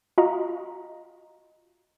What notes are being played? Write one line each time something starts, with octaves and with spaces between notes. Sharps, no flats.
F4 F#4 D#5 F5 A#5 C#6